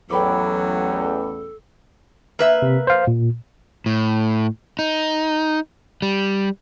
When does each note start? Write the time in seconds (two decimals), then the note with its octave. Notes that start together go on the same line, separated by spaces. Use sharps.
0.11 A1 E2 F#3 A4 G5 B5 D6
2.39 A#3 B4 E5
2.62 C3
2.87 C5 F5
3.07 A#2
3.86 A2
4.79 D#4
6.02 G3